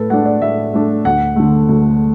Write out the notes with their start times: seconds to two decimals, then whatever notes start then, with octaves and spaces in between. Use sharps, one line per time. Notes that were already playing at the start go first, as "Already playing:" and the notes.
Already playing: A2 A4 B4
0.10 A3 D4 F#5
0.26 D5
0.41 A2 E5
0.73 A3 D4
1.05 D2 F#5
1.36 D3 A3
1.69 D2